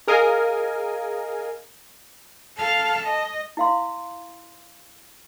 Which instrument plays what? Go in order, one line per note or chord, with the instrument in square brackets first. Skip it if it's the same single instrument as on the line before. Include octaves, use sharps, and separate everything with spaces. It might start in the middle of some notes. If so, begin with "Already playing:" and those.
[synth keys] G#4 A#4 D#5 F5 G#5
[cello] A4 F5 [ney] A5
[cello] D#5
[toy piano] E4 F5 C6